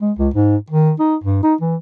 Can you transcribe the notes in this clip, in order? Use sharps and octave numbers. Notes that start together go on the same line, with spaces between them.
G#3
C#2
G#2
D#3
D#4
G2
D#4
E3